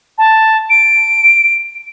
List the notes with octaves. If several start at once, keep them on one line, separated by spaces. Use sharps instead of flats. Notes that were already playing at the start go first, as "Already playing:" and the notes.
A5
D7